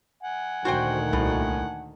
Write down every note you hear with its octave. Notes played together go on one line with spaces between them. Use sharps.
F#5 G#5
D2 A#2 D#3 F#4 C5 G5
C2 A2